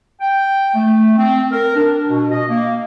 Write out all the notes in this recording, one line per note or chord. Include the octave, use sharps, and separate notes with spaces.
G5
A3
C4
A#4
D4
B2
D#5
A#3